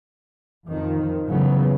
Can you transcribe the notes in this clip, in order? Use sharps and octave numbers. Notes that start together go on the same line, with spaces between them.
F2 D#3 F3
C#3 E3 F#3 B3